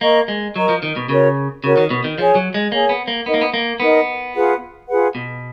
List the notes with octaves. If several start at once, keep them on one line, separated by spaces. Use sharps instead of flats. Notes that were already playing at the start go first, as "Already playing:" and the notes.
A#3 A#4 D#5 A#5 C#6
G#3
F#3 A#4 D#5 A#5 C#6
F3
D#3
B2
C#3 F#4 A#4 C#5
C#3 F#4 A#4 C#5
D#3
B2
D#3
F3 G#4 C#5 G#5
F#3
G#3
A#3 G#4 C#5 G#5
B3
A#3
B3 D#4 A#4 D#5
A#3
B3
A#3
B3 D#4 A#4 D#5
F4 G#4 B4 F#5
F4 G#4 B4 F#5
B2